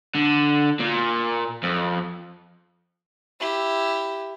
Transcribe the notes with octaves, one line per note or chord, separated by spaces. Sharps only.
D3
A#2
F2
E4 G4